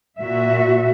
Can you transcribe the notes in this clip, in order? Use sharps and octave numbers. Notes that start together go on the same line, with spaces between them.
A#2 F#4 E5